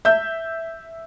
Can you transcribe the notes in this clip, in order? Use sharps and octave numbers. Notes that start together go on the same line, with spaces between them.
E5 G6